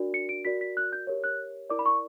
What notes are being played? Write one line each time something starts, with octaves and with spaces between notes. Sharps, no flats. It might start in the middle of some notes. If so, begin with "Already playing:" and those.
Already playing: D4 F#4 A#4 D5
C#7
D7
F#4 A#4 D5 B6
B6
F#6
G6
G4 A#4 C#5
F#6
E4 A#4 D5 D6
B5
C#6